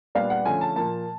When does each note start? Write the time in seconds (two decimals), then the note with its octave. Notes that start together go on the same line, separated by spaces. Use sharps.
0.15 A#2 G3 B3 D4 F5
0.30 F#5
0.45 D3 F3 A3 C#4 G#5
0.61 A5
0.76 A#2 F3 A#3 A5